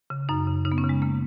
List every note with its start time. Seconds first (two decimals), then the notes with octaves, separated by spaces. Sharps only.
0.10 C#3
0.29 F#2 D#4
0.47 C#3
0.65 C#3 D#4
0.72 B3
0.78 C#4
0.84 C#3
0.89 G#3
1.02 C#3 A#3